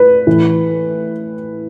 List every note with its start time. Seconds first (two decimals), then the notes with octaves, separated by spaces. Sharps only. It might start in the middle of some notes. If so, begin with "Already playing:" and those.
Already playing: A2 B4
0.27 A2 E3